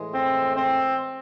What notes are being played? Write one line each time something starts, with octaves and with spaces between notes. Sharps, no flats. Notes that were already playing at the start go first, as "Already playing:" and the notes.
Already playing: A2 E3 G#3
C4
C4